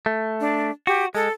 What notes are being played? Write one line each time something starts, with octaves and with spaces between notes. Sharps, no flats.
A3
D4
F#4 G4
G#3 A4